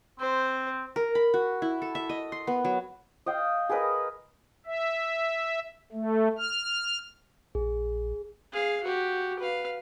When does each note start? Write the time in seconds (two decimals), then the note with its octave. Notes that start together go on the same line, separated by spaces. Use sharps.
0.20 C4 C5
0.96 A#4
1.15 B5
1.34 F#4
1.62 E4
1.82 A4
1.95 E5
2.09 D#5
2.32 C6
2.47 B3
2.65 F#3
3.26 D#5 F5 G5
3.69 G#4 A#4 B4 D#5
4.66 E5
5.92 A3
6.38 F6
7.55 A#1 G#4
8.52 G#4 F5
8.83 F#4 G4
9.39 B4 F5